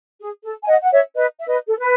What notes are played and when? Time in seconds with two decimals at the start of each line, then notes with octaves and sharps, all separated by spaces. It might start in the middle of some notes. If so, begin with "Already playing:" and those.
0.21 G#4
0.44 A4
0.63 G#5
0.68 D#5 F#5
0.82 F#5
0.91 C#5 E5
1.15 B4 D#5
1.39 E5
1.47 B4 D#5
1.67 A4
1.78 B4